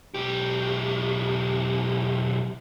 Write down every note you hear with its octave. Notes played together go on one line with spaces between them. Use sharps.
B1 G4